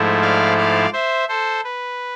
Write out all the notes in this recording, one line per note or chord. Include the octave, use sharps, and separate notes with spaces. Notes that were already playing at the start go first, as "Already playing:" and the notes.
Already playing: G#2 F3 A3 E4
D5 F5
D5 F5
C5 E5
A4 C5
B4